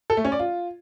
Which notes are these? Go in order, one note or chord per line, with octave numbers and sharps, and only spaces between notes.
A4
A3
C#4
D5
F4